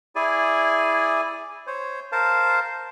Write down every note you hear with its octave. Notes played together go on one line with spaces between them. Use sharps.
E4 G#4 D5 G#5
C5 C#5
A#4 C5 F5 A5